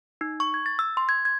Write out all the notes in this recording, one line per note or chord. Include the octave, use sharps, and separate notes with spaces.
D#4
C#6
G#6
A6
E6
C6
G#6
G#6